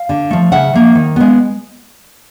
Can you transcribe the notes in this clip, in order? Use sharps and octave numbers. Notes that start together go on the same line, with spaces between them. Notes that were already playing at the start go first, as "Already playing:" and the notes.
Already playing: F5
D3
F3 A3
C#3 E5 F#5
F3 A#3
D#3
G#3 B3